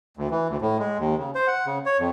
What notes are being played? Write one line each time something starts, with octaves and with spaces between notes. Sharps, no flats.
D2
E3
D2
A2
G#3
D#2
C#3
C5
F#5
C#3
C#5
F2